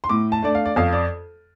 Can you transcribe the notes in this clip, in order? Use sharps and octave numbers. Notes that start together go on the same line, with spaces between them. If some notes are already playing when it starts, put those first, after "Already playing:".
C6
A2 D6
A5
A3 D4 D5
F5
D5
F2 F5
D5